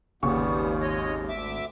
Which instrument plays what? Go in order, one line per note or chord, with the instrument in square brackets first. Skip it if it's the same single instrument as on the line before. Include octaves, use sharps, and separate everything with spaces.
[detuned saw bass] G#1 [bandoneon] D#2 [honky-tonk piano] A#2 C#3 C#6 [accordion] G3 B3
[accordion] G#3 C#5 D#5
D2 E5 D6